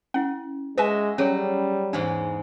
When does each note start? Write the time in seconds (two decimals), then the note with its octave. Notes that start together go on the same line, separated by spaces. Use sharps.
0.14 C#4 E4 F#5
0.78 G#3 F#4 B4 D#5 E5 G#5
1.18 F#3 G3 C#4 G#4 C#5
1.93 E2 G#2 G#3 D4